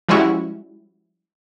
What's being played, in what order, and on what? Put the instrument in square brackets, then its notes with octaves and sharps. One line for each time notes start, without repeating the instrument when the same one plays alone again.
[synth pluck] F3 G3 G#3 C#4 E4 F#4